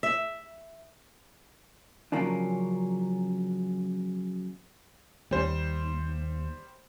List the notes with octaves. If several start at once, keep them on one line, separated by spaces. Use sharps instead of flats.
E5
C#3 F3 F#3 A#3 C#4 D4
D#2 G3 C5